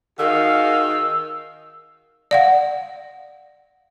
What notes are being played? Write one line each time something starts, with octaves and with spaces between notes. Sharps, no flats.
D#3 F#4 G#4 F5 E6
D5 F5 F#5